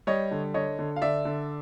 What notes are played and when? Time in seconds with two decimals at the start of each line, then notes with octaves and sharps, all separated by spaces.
0.07 G3 C#5 D#5
0.31 D3
0.54 D3 C#5 D#5
0.79 D3
0.96 F5
1.01 D3 D5 E5
1.25 D3